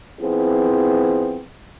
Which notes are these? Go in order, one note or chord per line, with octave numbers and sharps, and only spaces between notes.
F3 B3 C4 E4 G#4